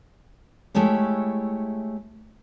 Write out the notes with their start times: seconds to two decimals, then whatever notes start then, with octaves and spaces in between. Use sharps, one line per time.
0.75 G#3 A3 E4 G4 C#5